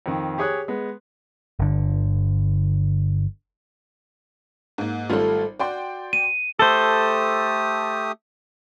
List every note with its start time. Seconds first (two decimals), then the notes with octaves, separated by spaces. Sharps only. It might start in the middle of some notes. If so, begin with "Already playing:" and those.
0.06 F2 D#3
0.38 G4 G#4 C#5 D#6 F#6
0.68 G#3 B3
1.59 G1 D3
4.78 G#2 A#3
5.10 G#1 G3 A3 F4 A4
5.59 F#4 D5 G5 C6
6.13 D#7
6.59 A3 G4 A4 C5 D#6